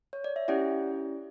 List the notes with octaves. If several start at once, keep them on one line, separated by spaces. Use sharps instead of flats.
C#5
D5
E5
C#4 E4 G4 D5 F#5